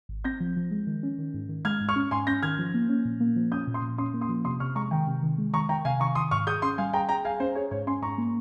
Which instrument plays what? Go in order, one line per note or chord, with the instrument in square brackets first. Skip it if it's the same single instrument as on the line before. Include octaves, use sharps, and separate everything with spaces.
[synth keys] G#1
[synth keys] C4 [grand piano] G6 A#6
[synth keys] F3
F3
G#3
D#3
C#4
D#3
G#2
D#3
[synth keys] G#3 [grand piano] F6 G#6
[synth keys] G#2
[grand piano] C#6 F6
[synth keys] C#4
[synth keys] G#2 [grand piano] G#5 C6
[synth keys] C#4 [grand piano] G6 A#6
[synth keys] D#3 [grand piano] F6 G#6
[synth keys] F3
A#3
C#4
A#2
A#3
F3
[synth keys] C#4 [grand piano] D#6 G6
[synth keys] A#2
[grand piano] C6 D#6
[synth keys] A#2
[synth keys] C#4 [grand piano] C6 D#6
[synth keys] A#3
[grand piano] C6 D#6
[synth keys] F3
[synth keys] C3 [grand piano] C6 D#6
[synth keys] C3 [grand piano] C#6 F6
[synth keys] G#3 [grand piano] A#5 C#6
[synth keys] D#3 [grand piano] G5 A#5
[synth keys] C3
D#3
G#3
[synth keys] D#3 [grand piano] A#5 C#6
[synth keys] D#3 [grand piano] G5 A#5
[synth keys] C3 [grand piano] F5 G#5
[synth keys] D#3 [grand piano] A#5 C#6
[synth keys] D#3 [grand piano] C6 D#6
[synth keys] G#2 [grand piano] C#6 F6
[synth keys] G#4 [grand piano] D#6 G6
[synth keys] C#4 [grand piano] C6 D#6
[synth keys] G3 [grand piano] F5 G#5
[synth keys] G#4 [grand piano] G5 A#5
[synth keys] G#4 [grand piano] G5 A#5
[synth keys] G#4 [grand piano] F5 G#5
[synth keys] C#4 [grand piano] C5
[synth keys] G#4 [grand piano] C#5
[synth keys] G#2 [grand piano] C#5
[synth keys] C#4 [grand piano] G#5 C6
[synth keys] G#2 [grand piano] A#5 C#6
[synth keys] A#3